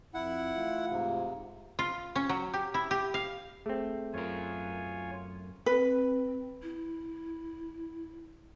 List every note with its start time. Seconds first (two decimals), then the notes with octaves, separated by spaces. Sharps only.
0.14 F2 E4 F#5
0.54 E3 A3 F4
0.90 G#2 C3
1.79 F4
2.16 C#4
2.29 F#3
2.54 G4
2.74 E4
2.91 G4
3.14 F5
3.66 A3 C4 G#4
4.14 F#2 F4 A#4 C#5 G#5
5.66 C4 B4
6.63 E4